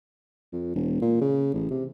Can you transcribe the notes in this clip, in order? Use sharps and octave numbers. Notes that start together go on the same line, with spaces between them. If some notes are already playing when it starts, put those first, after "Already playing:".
F2
E1
A#2
C#3
A1
C3